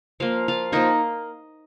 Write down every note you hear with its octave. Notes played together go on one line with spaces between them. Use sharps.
F3 A#3 F5
F4 F5
F3 A#3 D#4 D#5